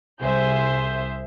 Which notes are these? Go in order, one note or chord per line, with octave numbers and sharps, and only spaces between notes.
C2 G#4 C5 E5 G6